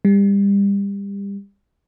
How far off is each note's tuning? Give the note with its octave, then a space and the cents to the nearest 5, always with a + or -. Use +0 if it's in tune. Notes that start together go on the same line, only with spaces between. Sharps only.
G3 +30